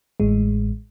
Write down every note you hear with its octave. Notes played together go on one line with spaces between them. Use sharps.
A1 A2 G#3